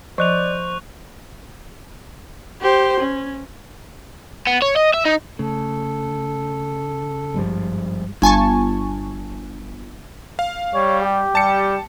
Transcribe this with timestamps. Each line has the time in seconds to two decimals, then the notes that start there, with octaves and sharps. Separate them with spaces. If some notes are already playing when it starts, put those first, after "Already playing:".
0.18 F3 C5 D5 D#5 C#6 F#6 F7
2.61 G4 C5
3.00 C#4
4.47 B3
4.62 C#5
4.76 D#5
4.94 E5
5.05 D#4
5.39 C#3 A3 A4
7.34 G#1 G2 F3 G3 G#3
8.22 G1 G#5 A5 C#6
10.39 F5
10.74 G3 C#5
11.03 G4
11.35 G3 A5 C#7